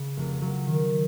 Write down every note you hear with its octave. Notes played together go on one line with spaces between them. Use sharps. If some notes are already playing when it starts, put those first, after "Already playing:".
Already playing: C#3
F1
F#3
D#3